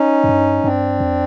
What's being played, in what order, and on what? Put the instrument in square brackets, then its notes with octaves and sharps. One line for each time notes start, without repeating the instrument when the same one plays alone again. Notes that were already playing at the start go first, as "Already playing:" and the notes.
Already playing: [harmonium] C#4 D#4
[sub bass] F#2
G2
[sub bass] G2 [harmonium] C4 D4
[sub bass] F2